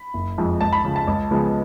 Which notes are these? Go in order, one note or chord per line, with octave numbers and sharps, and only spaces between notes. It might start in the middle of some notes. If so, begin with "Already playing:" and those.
Already playing: B5
F#1
F2 F3 G#3
C#2 A5
B5
C#3 F3
A5
C#2
C#3 F3 G#3 B3